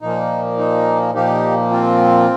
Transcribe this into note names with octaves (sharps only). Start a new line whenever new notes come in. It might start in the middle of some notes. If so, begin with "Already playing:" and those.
A#2 F3 A#3 D#4
D#4
A#2 F3 A#3 D#4 G4
C4 F4